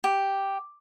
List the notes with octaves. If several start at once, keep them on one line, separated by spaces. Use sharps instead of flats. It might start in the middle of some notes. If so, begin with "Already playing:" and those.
G4